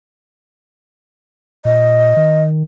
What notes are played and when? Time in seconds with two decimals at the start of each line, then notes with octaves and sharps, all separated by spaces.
1.65 A#2 D#5
2.17 D#3